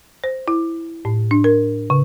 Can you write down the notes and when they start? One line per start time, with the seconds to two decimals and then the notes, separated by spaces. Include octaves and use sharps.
0.24 C5
0.48 E4
1.05 A2
1.31 D4
1.44 A#4
1.90 C#3